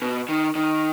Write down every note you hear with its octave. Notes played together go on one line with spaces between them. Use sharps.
B2
D#3
D#3